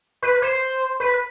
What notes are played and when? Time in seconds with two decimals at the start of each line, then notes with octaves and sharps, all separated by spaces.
0.22 B4
0.42 C5
1.00 B4